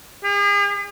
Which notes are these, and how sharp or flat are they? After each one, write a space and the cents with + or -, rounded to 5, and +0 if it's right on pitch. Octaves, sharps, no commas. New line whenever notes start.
G#4 -45